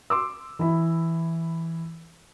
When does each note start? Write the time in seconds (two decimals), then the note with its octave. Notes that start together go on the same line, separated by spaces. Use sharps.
0.10 C6 D6 E6
0.59 E3 E4